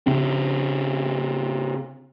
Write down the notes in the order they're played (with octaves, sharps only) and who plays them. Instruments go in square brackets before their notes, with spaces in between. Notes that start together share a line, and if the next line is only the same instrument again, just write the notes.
[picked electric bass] C#3 C4